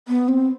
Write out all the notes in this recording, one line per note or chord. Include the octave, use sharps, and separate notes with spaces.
B3
C4